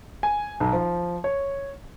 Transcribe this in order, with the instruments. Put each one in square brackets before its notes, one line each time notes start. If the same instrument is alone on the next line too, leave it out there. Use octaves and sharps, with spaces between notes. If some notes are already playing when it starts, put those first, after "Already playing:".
[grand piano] G#5
B1
F3
C#5